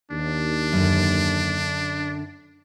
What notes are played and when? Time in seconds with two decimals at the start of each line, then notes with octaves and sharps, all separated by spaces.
0.10 D#2 D4
0.73 F#2 D3